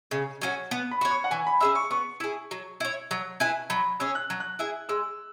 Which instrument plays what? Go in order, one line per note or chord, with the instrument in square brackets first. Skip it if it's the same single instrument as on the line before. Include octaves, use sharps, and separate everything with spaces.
[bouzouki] C#3
F#3 C#4 F#4
B3
[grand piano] B5
[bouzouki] F#4 C#5
[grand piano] C#6
F#5
[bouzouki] E3 [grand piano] G#5
[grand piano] B5
[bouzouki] C#4 G#4 E5 [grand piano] E6
[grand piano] C#6
[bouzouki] B3 [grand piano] C#6
[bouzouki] E4 G#4
F#3
E4 C#5
F#3
E4 G#4 B4
[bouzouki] F#3 [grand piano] B5
[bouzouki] C#4 G#4 C#5 [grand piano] E6
[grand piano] F#6
[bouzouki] F#3
[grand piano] F#6
[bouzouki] E4 G#4 E5
[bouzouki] G#3 [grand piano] E6